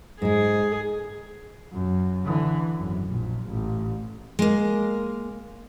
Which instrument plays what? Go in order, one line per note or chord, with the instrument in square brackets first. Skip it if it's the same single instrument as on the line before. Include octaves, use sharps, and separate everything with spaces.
[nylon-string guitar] G#2 G#3 [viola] G#4
[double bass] F#2
D3 E3
G#1 F#2
A#1 A#2
A1
[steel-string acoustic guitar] G#3 A#3